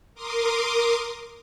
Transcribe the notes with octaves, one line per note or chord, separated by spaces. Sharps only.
A#4 C6 D6 D#6